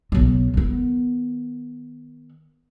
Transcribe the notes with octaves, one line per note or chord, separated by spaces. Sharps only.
B1 F#3
D#3 B3